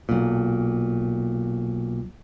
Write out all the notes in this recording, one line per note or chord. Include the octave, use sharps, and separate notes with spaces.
B1 A#2